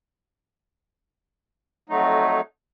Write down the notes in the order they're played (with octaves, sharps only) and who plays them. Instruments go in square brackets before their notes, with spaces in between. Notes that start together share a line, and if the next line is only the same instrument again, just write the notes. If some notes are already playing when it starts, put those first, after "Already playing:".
[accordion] F2 F#3 A3 D#4